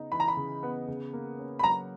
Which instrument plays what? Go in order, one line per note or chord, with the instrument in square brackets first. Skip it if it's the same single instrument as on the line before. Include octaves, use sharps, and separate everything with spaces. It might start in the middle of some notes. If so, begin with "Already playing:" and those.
Already playing: [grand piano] C#3 B3 D#4
[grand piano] E3 [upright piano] B5
[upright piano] A#5
B5
[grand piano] C#3
B3
C#3
A#3
C#4
[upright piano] B5
[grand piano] F#3 [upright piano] A#5